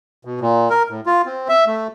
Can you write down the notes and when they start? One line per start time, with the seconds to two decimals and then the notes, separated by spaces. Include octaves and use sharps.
0.25 B2
0.41 A#2
0.70 A#4
0.90 A2
1.06 F4
1.26 C4
1.49 E5
1.67 A3